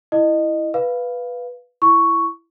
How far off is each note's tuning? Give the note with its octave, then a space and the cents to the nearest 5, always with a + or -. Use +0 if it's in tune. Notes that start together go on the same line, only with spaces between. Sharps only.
E4 +0 D#5 -20
B4 +0 F5 +0
E4 +15 C#6 +5